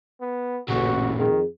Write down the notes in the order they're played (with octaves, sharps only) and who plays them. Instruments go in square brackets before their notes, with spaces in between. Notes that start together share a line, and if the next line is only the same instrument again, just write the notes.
[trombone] B3
[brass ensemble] A1 [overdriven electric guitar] A#2 C#3 [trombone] F#4
[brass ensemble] F2 G#4 [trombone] D#3